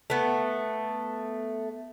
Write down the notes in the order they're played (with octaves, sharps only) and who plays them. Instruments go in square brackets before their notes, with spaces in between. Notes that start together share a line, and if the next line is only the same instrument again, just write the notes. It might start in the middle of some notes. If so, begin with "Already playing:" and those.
[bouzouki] A3 B3